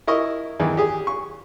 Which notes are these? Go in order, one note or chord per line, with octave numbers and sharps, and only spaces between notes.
E4 A#4 D#5 C#6
E2 D#3 E3
G4 G#4
C#6